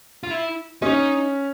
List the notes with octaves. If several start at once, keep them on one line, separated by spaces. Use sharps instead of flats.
F4
E4
C#4 D#4